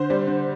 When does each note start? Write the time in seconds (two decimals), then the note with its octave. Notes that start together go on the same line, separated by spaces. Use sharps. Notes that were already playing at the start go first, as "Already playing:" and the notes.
Already playing: D3 C5
0.10 G3
0.27 D3